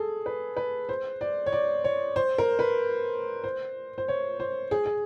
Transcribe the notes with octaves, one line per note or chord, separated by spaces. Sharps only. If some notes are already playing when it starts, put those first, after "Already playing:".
Already playing: G#4 A4
B4
B4
C5
D5
C#5
D5
C#5
C5
A#4
B4
C5
C5
C#5
C5
G#4
G#4